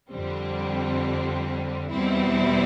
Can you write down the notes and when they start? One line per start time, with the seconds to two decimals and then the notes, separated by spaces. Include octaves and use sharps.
0.12 F2 D3 G3 C4
1.91 E2 B2 G3 C4 E4